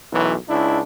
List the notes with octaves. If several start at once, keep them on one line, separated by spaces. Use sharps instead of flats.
B1 F#2 E3
C#2 D4 E4